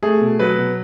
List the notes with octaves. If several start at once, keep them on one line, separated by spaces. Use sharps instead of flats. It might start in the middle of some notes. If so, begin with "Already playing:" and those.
A3 G#4
B2
F#3 B4
B2